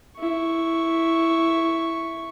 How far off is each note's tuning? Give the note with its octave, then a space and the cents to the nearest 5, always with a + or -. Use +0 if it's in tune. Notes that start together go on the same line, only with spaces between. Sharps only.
E4 +0 C#6 +0